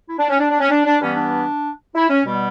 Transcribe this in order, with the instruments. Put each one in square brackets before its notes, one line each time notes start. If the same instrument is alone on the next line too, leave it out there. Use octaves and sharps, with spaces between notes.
[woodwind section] E4
D4
C#4
D4
D4
C#4
D4
D4
G2 E3 G3 B3 C#4
D4
E4
C#4
B2 G3 B3